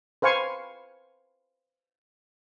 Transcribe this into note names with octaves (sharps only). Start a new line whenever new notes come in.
B4 C5 F5 G#5 C#6